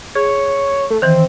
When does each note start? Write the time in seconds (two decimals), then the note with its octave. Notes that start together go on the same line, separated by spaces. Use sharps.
0.15 G#4 C#5
0.90 A3
1.02 D#3 E3 C4